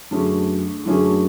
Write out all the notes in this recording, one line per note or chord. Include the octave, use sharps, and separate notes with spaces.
F#2 D3 A3 C#4 G#4
F#2 D3 A3 C#4 G#4